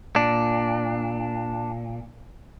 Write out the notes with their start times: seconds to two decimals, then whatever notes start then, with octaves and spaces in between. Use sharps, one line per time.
0.16 A#2 D4